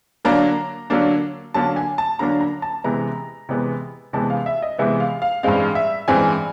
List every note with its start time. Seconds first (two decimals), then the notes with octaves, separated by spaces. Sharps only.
0.25 D3 F#3 A#3 D4 A#5
0.90 D3 F#3 A#3 D4
1.54 D3 F#3 A#3 D4 A5
1.76 G#5
1.98 A5
2.19 D3 F#3 A#3 D4 A#5
2.41 A#5
2.62 A5
2.84 C3 E3 G#3 B3 A#5
3.49 C3 E3 G#3 B3
4.13 C3 E3 G#3 B3 A5
4.30 F5
4.46 E5
4.62 D#5
4.78 C3 E3 G#3 B3 E5
5.00 F5
5.22 F5
5.43 G2 E3 G#3 C4 F5
5.75 E5
6.08 G2 E3 G#3 C4 G#5